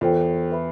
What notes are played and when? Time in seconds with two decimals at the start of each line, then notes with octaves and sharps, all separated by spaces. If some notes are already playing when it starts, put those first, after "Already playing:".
0.01 E2 F4 A4 C5 G5
0.51 B4 E5 B5